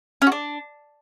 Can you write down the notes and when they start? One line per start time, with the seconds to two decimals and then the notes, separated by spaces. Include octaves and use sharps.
0.22 C#4
0.27 F#4
0.32 D4